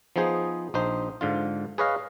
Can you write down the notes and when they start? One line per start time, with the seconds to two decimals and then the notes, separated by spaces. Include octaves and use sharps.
0.16 F3 B3 D#4 G#4 C5
0.74 A#1 D#4 C5
1.21 G#2 D3 F4
1.78 G#4 B4 C#5 D#5 F5